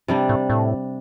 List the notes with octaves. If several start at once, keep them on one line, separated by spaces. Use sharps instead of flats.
C3 G3 D4
A2
A2